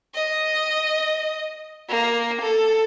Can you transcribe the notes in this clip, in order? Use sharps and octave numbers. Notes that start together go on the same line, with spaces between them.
D#5
A#3
A4